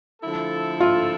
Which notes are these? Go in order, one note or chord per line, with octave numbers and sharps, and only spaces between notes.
D3 F3 A3 E4 A4
F4